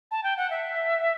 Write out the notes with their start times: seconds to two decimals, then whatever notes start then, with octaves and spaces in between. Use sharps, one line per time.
0.11 A5
0.23 G5
0.37 F#5
0.50 E5